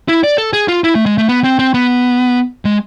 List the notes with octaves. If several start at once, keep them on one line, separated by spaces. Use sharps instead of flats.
E4
D5
A4
G#4
F4
E4
A3
G#3
A3
B3
C4
C4
B3
G#3